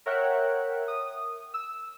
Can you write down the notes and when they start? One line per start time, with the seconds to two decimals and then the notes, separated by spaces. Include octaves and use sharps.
0.06 A#4 C#5 E5 F#5 G5 F#6
0.88 D#6
1.54 E6